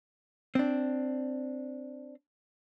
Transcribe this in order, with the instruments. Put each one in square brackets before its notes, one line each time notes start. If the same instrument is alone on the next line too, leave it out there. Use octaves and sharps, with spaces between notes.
[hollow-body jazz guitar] C4 D4